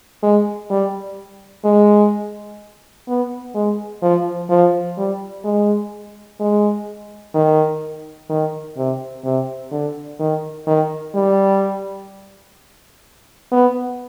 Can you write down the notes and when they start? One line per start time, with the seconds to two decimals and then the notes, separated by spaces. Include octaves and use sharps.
0.23 G#3
0.70 G3
1.65 G#3
3.08 B3
3.55 G#3
4.02 F3
4.50 F3
4.98 G3
5.45 G#3
6.40 G#3
7.34 D#3
8.30 D#3
8.77 C3
9.24 C3
9.72 D3
10.20 D#3
10.67 D#3
11.15 G3
13.52 B3